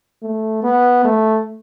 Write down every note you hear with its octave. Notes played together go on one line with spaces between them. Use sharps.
A3
B3
A3